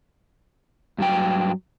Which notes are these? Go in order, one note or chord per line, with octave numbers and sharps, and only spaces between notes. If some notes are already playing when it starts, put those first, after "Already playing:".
G2 F#3 G5